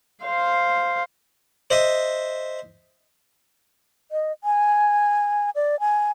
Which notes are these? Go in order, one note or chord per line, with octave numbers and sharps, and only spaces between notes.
C5 F5
C5 D#5 E5 D#6
D#5
G#5
D5
G#5